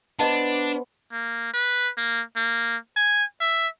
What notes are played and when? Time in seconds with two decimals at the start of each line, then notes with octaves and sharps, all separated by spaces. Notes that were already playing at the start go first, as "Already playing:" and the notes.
0.19 B3 D4 B4 C5 D#5 A5
1.12 A#3
1.54 B4
1.98 A#3
2.36 A#3
2.96 G#5
3.41 E5